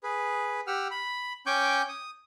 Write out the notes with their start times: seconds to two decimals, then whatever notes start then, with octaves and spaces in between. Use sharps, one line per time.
0.03 G#4 B4
0.67 G4 F#5 E6 F6
0.91 B5
1.46 C#4 G5 G#5 C#6 D6 G6
1.89 D#6